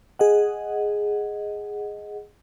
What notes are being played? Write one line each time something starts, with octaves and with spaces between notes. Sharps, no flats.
G#4 D#5 F#5